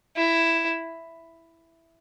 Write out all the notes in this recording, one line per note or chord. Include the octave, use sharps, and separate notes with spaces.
E4